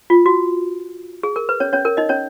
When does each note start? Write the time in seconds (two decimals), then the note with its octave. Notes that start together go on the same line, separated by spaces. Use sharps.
0.10 F4
0.26 F#4
1.23 G#4
1.36 A#4
1.49 B4
1.60 C#4 C#5
1.73 C#4 C#5
1.85 A#4
1.97 D#4 D#5
2.09 C#4 C#5